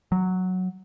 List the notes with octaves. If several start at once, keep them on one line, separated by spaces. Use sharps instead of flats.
F#3